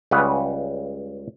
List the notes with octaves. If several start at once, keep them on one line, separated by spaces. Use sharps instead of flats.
C#2 C#3 G3 B4 F#5